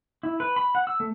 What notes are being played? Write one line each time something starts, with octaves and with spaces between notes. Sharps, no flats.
E4
B4
B5
F#5
E6
A3